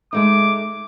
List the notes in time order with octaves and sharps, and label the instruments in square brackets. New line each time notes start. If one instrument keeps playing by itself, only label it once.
[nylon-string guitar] G#3 A3 D#4 [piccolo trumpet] D6